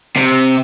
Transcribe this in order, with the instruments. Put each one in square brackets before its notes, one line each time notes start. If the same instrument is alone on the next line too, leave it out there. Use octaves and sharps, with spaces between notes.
[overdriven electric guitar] C3